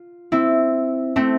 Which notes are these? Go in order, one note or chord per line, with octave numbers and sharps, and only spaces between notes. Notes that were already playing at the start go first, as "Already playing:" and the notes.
Already playing: F4
C4 E4
A3 C4